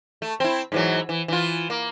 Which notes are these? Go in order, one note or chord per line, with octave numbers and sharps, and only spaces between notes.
A3
C4 E4
G#2 E3 F#3
E3
E3 F4
A#3